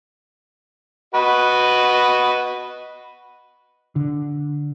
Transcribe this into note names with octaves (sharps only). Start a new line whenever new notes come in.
F#4 B4 D#5
D3